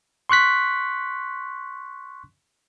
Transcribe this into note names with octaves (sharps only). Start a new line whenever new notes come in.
C6 C#6 F#6 B6